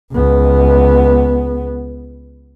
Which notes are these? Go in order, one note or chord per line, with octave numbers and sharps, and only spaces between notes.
C#2 B3